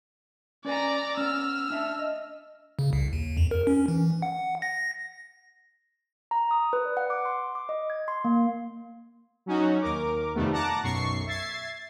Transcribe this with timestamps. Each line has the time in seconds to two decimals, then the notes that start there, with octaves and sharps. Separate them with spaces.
0.65 C#4 B4 D5 G#5 A#5
1.17 B3 C#4 E6 F6
1.70 D4 E5 A5
1.99 D#5
2.79 C#3
2.93 C2
3.13 D#2
3.37 F2
3.51 A#4
3.67 C#4
3.88 E3
4.22 F#5
4.62 A#6
6.31 A#5
6.51 D#6
6.73 B4
6.85 D5
6.97 F#5
7.10 D6
7.26 C6
7.55 D6
7.69 D#5
7.90 G#6
8.08 C6
8.25 A#3
9.46 F#3 C#4 D#4 F#4
9.81 D#2 A#4 D6
10.34 F2 C3 D#3 G3 A3 B3
10.52 F#5 A5 A#5 D6 F#6 A#6
10.83 B1 F#2 C#6 C7
11.26 E5 G#6 A6 C7